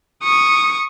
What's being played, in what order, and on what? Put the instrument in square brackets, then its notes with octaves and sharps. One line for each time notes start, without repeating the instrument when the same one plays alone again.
[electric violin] C#6 D#6